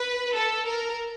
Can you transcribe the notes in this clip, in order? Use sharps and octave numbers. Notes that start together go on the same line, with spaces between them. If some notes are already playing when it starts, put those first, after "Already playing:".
Already playing: B4
A4
A#4